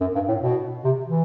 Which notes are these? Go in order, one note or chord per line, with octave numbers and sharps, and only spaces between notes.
F#2
G2
A2
B2
C3
E3